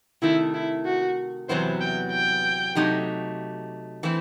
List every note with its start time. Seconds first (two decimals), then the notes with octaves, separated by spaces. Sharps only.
0.22 C3 D#3 A3 E4
0.54 E4
0.85 F#4
1.49 E2 C3 F#3 B3 E4 C5
1.81 G5
2.12 G5
2.75 C3 F#3 A3 D#4 G4
4.03 E3 A3 C4 E4